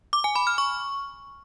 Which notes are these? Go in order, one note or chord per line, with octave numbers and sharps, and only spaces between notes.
D6
G#5
B5
F6
C#6